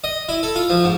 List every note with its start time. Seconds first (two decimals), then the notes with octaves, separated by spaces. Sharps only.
0.04 D#5
0.29 E4
0.43 A4
0.56 F4
0.70 F3
0.84 G#2